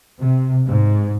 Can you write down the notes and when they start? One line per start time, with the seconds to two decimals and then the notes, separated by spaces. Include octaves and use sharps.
0.20 C3
0.65 G#2